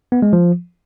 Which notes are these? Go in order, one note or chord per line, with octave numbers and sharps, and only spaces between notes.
B3
G#3
F3